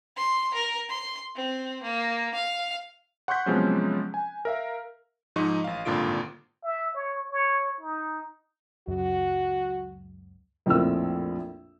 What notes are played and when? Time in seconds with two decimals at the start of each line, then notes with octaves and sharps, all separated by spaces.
0.17 C6
0.54 A#4
0.89 C6
1.36 C4
1.83 A#3
2.35 F5
3.28 F#5 C6 C#6 F#6 G6 B6
3.46 C3 F3 F#3 G#3 B3 C#4
4.14 G#5
4.45 A#4 E5 F5
5.36 G#2 F3 D#4 D#5 C#6
5.64 A1 F5
5.85 G#1 G2 A#2 D3 F4 D7
6.64 E5
6.95 C#5
7.32 C#5
7.81 D#4
8.87 C#2 F#2 F#4
10.66 A#1 F2 A2 C4 A#4 E6